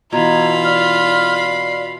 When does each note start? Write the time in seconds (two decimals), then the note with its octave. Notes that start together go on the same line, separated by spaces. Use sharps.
0.13 B2 E3 F4 A#5 B5 G#6
0.64 D5 F6
1.37 C7